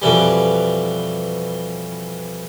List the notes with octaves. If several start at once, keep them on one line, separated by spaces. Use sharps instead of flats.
F2 B2 E3 G3